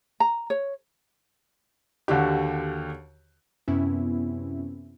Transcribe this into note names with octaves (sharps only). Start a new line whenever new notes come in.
A#5
C#5
D#2 D3 F#4 G4
F#2 C3 B3 C#4 E4